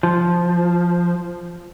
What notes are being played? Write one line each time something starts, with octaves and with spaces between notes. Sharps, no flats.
F3